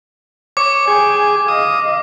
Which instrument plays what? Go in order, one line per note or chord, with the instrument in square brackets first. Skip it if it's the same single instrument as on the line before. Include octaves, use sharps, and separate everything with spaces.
[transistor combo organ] C#5 [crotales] D6
[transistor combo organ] G#4 [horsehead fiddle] G5 G#5
[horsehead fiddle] D#5 F5 [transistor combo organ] D#6